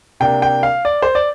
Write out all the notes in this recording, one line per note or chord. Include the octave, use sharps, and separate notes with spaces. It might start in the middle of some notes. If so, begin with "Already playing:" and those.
C3 A#3 D4 G5
G5
F5
D5
C5
D5